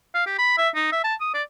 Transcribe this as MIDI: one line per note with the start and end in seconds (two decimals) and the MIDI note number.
0.15 0.25 77
0.27 0.36 67
0.39 0.54 83
0.58 0.69 76
0.75 0.88 63
0.93 1.02 76
1.04 1.14 81
1.21 1.31 87
1.34 1.43 74